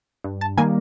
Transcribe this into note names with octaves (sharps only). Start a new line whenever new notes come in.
G2
A5
D#3 G3 A#3 G#5